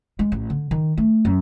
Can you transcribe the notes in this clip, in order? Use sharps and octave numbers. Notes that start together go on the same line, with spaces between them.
G#3
A1
D3
D#3
A3
F#2